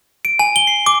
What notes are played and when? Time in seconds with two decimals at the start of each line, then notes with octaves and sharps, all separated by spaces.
0.25 D7
0.39 G#5
0.56 G7
0.67 C7
0.86 D6